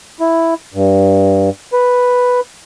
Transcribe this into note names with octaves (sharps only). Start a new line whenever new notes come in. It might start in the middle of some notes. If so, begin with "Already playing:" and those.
E4
G2
B4